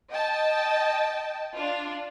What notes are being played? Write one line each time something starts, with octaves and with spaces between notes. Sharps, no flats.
D#5 G5 A5
D4 F4